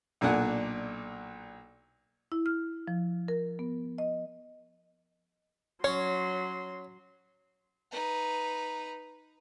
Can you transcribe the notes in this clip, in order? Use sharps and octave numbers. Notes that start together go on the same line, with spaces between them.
B1 A#2 D4 F#5 G#5
E4
F6
F3
A#4
B3
D#5
F#3 C#4 C#5 C6
D#4 B4